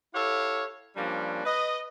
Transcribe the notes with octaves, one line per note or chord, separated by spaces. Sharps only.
E4 G4 A4 C#5 F5
F3 G3 A#3 C#4 D4
B4 D#5